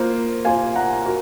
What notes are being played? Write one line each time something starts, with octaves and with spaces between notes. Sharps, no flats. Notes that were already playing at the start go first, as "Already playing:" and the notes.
Already playing: A#3 F4 C5
A#3 F4 C5 F5 G#5
F#5 A#5
F#4 A#4